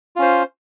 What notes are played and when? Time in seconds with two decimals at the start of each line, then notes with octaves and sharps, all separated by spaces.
0.16 F4
0.19 C#4
0.22 C5